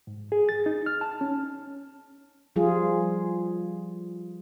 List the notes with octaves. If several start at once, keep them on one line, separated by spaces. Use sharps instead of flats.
G#2
G#4
A6
D#4
F6
A5
C#4
F3 G3 F4 G#4